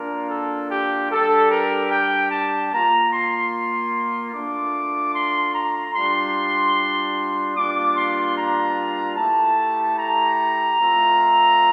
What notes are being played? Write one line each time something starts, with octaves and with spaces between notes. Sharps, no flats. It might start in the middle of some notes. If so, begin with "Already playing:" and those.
Already playing: A#3 D4 F4 A#4
A4
G4
G3 D4 G4 A4
A#4
G5
A5
A#3 F4 A#5
C6
A3 D4 F4 D6
C6
A#5
G3 D4 F4 C6
G3 A#3 D4 F4 D6
C6
A#5
A3 E4 G4 A5
A#5
A3 C4 F4